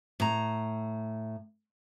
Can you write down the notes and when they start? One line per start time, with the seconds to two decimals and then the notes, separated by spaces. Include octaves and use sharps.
0.20 A2 A#5